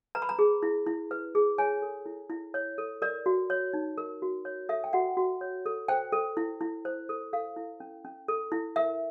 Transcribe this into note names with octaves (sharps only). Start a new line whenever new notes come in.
B4 A#5
B5
A#5
G#4
E4
E4
B4
G#4
C#5 G#5
A4
E4
E4
C#5
A4
A#4 D5
F#4
C#5
D#4
A#4
F#4
C#5
A4 E5
G5
F#4 F#5
F#4
C#5
A4
C5 G5
A4
E4
E4
C5
A4
A4 F5
E4
C#4
C#4
A4
E4
A#4 E5